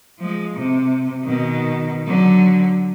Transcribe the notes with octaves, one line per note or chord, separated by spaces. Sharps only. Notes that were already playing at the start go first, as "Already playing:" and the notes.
F3 G#3
C3
B2 D#3
D3 F#3